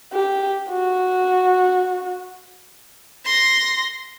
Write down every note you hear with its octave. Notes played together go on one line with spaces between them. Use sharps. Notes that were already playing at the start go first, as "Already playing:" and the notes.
G4
F#4
C6 A#6